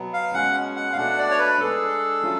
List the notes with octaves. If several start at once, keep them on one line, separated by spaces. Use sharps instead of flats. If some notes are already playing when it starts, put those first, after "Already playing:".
Already playing: B2 F#3 B3
F5
B2 G#3 C#4 F#5
F#5
F5
B2 A3 D4 F#5
D5
C#5
B4
G#3 D4 G#4 A4
F#3 A3 C#4 F4